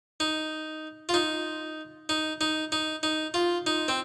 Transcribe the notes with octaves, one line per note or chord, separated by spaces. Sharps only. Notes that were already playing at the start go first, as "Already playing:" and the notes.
D#4
F4
D#4
D#4
D#4
D#4
D#4
F4
D#4
C4